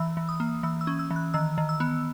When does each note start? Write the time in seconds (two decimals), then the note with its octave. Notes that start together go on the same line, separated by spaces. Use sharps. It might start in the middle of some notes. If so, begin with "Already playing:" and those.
Already playing: E3 E6
0.17 E3
0.29 D#6
0.40 A#3
0.63 E3 E6
0.81 E6
0.87 C#4
0.99 E6
1.11 E3
1.16 F#6
1.34 D#3 E6
1.58 D#3
1.69 E6
1.80 B3